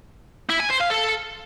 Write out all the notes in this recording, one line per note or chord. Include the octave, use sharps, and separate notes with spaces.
E4
G#5
C5
F5
A4